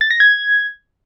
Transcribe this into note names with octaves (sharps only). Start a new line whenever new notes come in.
A6
A#6
G#6